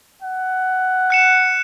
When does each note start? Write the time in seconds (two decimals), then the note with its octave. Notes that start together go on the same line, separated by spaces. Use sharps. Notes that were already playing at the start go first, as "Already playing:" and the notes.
0.22 F#5
1.10 F#6 C#7 E7